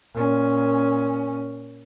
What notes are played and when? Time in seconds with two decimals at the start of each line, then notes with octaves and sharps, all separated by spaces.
0.13 A#2 C#4